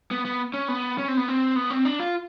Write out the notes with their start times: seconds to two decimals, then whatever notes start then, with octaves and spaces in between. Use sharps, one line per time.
0.11 B3
0.25 B3
0.54 C#4
0.68 B3
0.98 C#4
1.08 C4
1.17 B3
1.28 C4
1.56 B3
1.70 C4
1.85 D4
2.00 F4